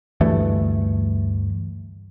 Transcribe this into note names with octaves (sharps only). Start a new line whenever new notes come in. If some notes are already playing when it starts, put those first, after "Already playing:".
D2 G2 E3 A3